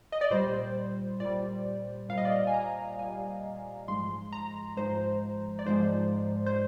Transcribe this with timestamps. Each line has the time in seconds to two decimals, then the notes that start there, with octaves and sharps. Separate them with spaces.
0.12 D#5
0.21 D5
0.31 A#2 G3 C5
1.20 A#2 G3 D5
2.09 A#2 G3 F5
2.18 D#5
2.25 D5
2.32 D#5
2.47 G#5
2.54 A#5
2.99 A#2 G3 G#5
3.88 G#2 F3 G#3 C6
4.33 A#5
4.77 G#2 F3 G#3 C5
5.59 D5
5.66 G#2 F3 G#3 C5
6.46 C5